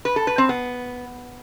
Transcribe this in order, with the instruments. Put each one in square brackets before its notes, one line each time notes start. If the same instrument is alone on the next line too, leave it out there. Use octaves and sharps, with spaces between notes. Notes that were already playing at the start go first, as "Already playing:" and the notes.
[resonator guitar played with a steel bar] B4
A4
B4
C4
B3